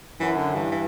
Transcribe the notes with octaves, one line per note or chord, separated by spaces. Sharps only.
F#2 E3
D3
G2 E3
E3